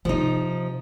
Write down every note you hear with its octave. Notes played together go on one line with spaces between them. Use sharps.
C3 F3 D#4